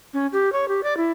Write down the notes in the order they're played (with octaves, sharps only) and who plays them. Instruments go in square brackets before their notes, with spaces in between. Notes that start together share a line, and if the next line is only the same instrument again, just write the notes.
[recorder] C#4
G4
C#5
G4
D5
E4